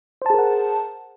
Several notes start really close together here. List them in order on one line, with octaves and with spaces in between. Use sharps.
C5 A5 G#4 A#4 F#5